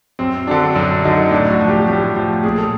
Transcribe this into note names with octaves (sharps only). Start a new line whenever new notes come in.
F#2 C4
D3 F#3 D4
F#2 D4
D3 F#3 D#4
A2 D4
F#4
F3
G4
A2 G4
F3
A#2 G#4
A4